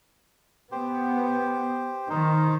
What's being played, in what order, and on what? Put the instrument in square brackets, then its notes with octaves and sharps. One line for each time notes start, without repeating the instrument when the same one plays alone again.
[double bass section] B3 [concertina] G4 C5
[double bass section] D#3 [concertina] D#4 C5